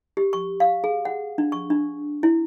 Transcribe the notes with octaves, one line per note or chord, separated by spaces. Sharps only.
G4
C#6
F5
G#4
F#5
D4
C#6
D4
E4